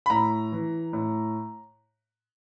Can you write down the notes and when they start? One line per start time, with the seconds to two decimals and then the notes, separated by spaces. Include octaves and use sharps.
0.06 B5
0.10 A2 A#5
0.52 E3
0.93 A2